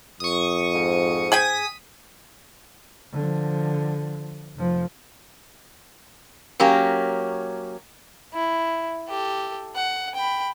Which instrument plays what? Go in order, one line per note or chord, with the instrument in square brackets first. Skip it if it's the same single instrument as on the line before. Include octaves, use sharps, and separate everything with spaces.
[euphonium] F2 [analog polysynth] C#6 D#6
[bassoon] G#2
[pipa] G#4 G5 G#5 [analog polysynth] D#6 B6 D#7
[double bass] D3 F3
F1 F3
[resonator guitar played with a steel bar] F#3 A#3 C#4 G4
[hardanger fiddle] E4
G4 A4
F#5
G5 B5